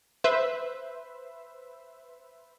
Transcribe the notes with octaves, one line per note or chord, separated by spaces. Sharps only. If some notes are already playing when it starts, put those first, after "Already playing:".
B4 C5 E5